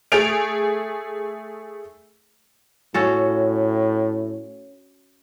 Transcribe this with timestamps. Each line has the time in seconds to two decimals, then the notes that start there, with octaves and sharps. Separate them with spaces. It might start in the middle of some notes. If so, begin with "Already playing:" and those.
0.12 A3 G#4 D7 F7
2.94 A2 C#4 F#4 A4